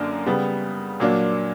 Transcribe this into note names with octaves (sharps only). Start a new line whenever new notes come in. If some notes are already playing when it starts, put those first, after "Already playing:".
Already playing: F#2 D3 A#3 D4 A#4
C#3 G3 B3
A#2 F#3 A#3 D4